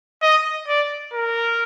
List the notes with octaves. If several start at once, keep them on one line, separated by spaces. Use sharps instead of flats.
D#5
D5
A#4